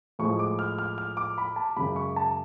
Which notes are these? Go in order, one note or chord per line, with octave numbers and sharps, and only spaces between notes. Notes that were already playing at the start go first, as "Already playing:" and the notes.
A2 F3 G#3 C#6
D6
F6
F6
F6
D6
B5
A5
F#2 C#3 G#3 B5
C#6
A5